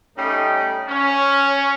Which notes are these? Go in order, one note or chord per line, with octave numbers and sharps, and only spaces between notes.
G3 A3 C#4 D#4
C#4